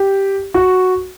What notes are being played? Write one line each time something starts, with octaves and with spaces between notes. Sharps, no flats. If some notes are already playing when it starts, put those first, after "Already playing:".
Already playing: G4
F#4